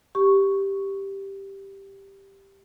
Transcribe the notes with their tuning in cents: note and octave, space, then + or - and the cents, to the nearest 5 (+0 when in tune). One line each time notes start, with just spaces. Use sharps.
G4 +0 C#6 +0